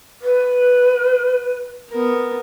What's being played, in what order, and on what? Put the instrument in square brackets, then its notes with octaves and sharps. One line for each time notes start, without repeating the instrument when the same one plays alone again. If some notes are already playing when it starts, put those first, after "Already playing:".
[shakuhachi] B4
[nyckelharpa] B3 A#4